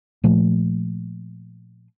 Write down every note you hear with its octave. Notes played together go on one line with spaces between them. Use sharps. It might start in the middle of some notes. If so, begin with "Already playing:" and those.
A#2 F3 A3